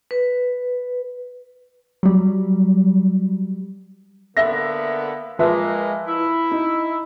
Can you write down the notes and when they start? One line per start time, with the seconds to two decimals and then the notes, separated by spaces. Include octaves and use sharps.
0.11 B4
2.03 F#3 G3
4.37 D3 A#3 B3 E5 A#6
5.39 F3 G#3 A#3 B4 E5
6.07 E4
6.51 D#4